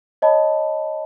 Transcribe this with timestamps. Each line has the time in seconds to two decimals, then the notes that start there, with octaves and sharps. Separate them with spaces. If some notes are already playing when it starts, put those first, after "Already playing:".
0.22 C#5 D#5 A5 B5